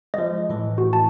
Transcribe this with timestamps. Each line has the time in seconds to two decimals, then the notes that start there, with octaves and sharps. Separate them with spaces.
0.14 F3 G#3 D#5
0.49 A2 E3
0.78 F#4
0.93 A5